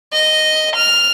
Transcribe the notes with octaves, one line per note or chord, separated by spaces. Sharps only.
D#5
F6